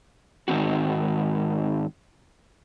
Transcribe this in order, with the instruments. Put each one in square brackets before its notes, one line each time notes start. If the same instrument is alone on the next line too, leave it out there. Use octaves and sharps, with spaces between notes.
[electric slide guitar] G#2 D#3 G3 C4 F#4